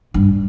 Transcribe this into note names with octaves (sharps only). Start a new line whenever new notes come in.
G2